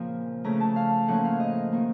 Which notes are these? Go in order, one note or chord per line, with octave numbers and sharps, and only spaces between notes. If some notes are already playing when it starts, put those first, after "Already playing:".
Already playing: A#2 C#3 F3 A#3 C4 F5
C#3 A3 C#4 A#5
A5
F5
A2 F3 A#3 C#4 F#5
F5
D#5
D#3 A#3